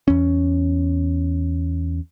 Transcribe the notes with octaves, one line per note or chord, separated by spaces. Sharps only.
E2 C#4